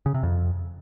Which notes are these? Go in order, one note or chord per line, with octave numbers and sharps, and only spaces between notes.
C#3
C3
F2